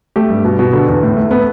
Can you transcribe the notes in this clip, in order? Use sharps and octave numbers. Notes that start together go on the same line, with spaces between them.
A3 G4
G2
B2
B2
D3 A4
E2
A2
A3
B3 A4